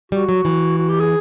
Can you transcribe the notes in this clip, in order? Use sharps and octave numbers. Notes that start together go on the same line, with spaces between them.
G3 F#4
F#3
E3
F#4
G4
G#4